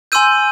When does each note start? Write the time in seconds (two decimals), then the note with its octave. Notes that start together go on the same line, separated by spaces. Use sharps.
0.12 G#5 C6 E6 G6 D#7